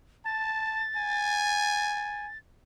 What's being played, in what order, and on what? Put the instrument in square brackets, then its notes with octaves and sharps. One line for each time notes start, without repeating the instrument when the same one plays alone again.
[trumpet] A5 [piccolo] A6
[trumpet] G#5